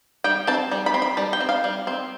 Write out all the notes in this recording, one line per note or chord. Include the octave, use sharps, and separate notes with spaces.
G3 G5
C4 A5
G3
B5
C4
B5
G3 A5
G5
C4
F5
G3
C4